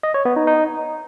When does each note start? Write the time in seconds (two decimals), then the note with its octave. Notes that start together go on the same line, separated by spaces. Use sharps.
0.03 D#5
0.14 C#5
0.25 B3
0.36 D#4
0.47 D#4